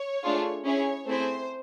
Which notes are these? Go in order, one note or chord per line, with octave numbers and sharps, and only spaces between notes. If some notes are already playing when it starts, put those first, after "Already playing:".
Already playing: C#5
A3 D4 F4 G#4
C#4 E4 G#4 C#5
A3 C4 E4 G#4 C5